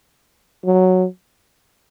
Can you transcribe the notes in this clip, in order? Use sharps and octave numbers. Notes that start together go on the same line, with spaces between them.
F#3